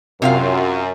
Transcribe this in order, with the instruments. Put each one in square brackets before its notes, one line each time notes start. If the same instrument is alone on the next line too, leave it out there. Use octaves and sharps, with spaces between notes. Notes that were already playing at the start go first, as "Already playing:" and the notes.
[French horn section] F#2 [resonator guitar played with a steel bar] C3 F4 F5